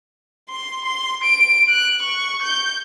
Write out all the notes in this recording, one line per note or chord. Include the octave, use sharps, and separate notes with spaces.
C6
C6
D7
F#6
C#6
G6